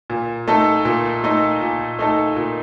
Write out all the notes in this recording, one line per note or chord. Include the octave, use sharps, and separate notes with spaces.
A#2
A3 D#4 A4
A#2
A3 D#4 A4
A#2
A3 D#4 A4
A#2